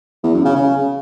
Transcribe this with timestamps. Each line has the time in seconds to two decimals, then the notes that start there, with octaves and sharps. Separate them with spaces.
0.23 E2
0.34 F#2
0.45 C#3
0.56 C#3